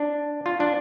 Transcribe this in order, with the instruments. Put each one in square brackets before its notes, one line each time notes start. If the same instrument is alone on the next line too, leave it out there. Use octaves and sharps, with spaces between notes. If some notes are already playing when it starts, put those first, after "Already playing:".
Already playing: [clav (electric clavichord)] D4
F4
D4